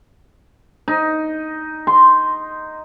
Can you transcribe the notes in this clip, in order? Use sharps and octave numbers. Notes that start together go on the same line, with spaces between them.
D#4
C6